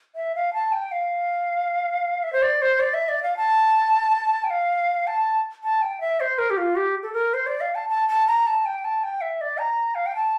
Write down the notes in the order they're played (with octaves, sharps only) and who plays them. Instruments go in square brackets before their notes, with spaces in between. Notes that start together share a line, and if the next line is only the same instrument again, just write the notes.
[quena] E5
F5
A5
G5
F5
E5
C5
D5
C5
D5
E5
D5
F5
A5
G5
F5
A5
A5
G5
E5
C5
A#4
G4
F4
G4
A4
A#4
C5
D5
F5
A5
A5
A5
A#5
A5
G5
A5
G5
E5
D5
A#5
F5
G5
A5